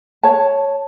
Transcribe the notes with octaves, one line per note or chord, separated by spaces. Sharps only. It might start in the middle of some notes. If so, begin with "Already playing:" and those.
C#5 A5